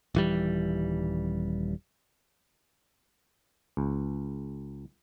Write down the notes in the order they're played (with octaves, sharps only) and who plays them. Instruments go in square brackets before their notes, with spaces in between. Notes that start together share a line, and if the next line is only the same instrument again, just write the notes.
[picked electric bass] D#1 E3 G3
[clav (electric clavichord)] C#2